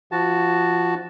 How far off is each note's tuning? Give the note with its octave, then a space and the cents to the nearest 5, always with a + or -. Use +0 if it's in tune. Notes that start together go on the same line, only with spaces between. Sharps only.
F3 -20 F#4 +0 A5 +0